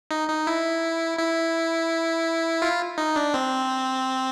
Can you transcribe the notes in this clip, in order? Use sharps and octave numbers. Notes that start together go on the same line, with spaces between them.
D#4
D#4
E4
E4
F4
D#4
D4
C4